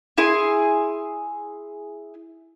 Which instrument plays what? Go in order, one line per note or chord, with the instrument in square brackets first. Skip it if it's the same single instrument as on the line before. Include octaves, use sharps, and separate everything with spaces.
[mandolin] E4 G#4 C6